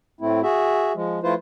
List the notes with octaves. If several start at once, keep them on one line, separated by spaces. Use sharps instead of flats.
A2 A3 C4 E4
F#4 G#4 E5
F3 G#3
F3 A3 E4 F4 B4 C5